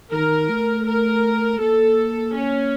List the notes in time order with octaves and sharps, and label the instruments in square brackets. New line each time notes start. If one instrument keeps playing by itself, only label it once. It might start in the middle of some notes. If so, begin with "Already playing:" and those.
[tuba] D#3 [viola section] A#4
[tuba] A3
[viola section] A#4
[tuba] A#3 [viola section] A4
[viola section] C#4